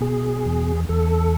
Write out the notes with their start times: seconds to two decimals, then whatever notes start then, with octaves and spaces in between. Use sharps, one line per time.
0.01 B2 G#4
0.45 E2
0.89 E2 A4